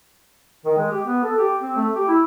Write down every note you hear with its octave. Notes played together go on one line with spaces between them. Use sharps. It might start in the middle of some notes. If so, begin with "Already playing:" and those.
D#3
G#3
G4
B3
A4
G4
C4
A3
G4
E4